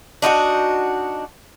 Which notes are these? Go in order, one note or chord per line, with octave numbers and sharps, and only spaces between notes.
D4 D#4 F4 F#4